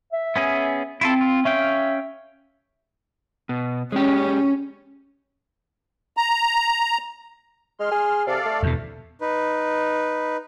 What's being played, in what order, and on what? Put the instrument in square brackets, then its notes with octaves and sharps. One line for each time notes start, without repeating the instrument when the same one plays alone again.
[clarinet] E5
[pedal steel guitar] B3 C#4 G#4
[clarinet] C4 [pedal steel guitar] E4 F4 A4
[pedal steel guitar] F4
[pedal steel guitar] C#4 F5 G5 [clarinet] E5
[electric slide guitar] B2
[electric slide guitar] G#3 G4 [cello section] C#4
[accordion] A#5
[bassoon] G#3 [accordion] C6 F6
[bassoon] G#4
[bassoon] C3 [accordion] A4 D5 F5
[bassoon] A3
[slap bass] E2 B2
[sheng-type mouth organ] D#4 B4